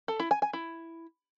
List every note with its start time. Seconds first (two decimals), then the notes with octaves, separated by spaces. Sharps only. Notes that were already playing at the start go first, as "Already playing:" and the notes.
0.08 A4
0.20 E4
0.31 G#5
0.42 G#5
0.53 E4